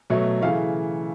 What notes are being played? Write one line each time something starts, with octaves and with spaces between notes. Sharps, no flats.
B2 F#3 A3
C#3 E3 A3 F5